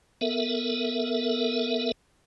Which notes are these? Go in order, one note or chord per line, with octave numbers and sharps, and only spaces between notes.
B3 A4 A#4 E5